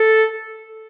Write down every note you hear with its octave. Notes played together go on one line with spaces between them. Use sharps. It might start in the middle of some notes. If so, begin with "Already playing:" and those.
Already playing: A4